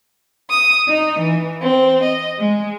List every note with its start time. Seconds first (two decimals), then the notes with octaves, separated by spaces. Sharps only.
0.50 D#6
0.88 D#4
1.20 E3
1.61 C4
2.02 D#5
2.37 G#3